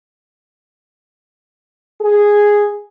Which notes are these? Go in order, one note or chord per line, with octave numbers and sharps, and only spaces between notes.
G#4